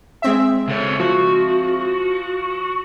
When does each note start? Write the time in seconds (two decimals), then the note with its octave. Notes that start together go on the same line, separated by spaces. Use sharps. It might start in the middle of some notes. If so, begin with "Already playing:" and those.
0.22 G#3 C4 E5
0.68 C#3 A4 C#5
1.00 F3 F#4